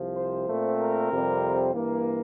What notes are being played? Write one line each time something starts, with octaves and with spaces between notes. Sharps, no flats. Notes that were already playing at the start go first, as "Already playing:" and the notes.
Already playing: C2 C3 F3
C5
A#2 A3 C4
A#4
F2 C3 G3 C4
G2 E3 A#3